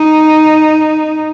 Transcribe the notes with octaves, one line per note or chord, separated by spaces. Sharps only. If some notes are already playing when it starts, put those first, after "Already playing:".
Already playing: D#4